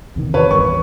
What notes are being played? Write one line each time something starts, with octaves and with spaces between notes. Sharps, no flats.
E2 C3 D#3
B4 C#5
A1 E2 G2 C#6